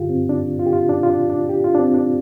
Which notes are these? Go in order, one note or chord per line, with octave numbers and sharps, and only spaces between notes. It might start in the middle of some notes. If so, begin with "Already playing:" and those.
Already playing: G2 D3 F4 G4
C4
D4
F4
G4
F4
D4
F4
D4
D4
G4
F4
D4
C4
D4